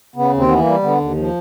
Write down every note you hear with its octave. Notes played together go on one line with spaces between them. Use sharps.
C#3 B3
D#2
C4
E3 B3
A#3
G3
D3 B3
D#2
F3